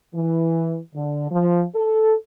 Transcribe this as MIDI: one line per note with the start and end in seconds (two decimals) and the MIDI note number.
0.15 0.78 52
0.94 1.28 50
1.31 1.64 53
1.75 2.14 69